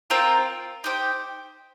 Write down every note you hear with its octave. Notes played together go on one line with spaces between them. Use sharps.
C4 F4 A#4 G5
D#4 G4 C5 G5